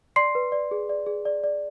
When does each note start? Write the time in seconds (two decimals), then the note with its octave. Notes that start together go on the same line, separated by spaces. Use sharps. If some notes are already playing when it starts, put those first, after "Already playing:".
0.16 D5 C6 C7
0.35 B4
0.52 D5
0.71 G#4
0.89 D5
1.06 G#4
1.25 D5
1.43 D5